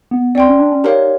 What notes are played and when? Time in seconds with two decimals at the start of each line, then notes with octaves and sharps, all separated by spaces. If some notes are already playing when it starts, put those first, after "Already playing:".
0.11 B3
0.35 C4 D5 G5 C6
0.47 C#4
0.59 D4
0.72 C#4
0.84 D#4 G4 A#4 C#5 F5